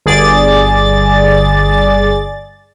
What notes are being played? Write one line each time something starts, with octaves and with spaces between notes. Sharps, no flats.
G1 G#4 D5 A6